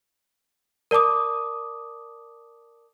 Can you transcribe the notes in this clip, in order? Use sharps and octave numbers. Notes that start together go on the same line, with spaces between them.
A#4 D5 A5 D6 D#6